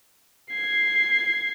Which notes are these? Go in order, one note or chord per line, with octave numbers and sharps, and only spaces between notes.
G#6 C7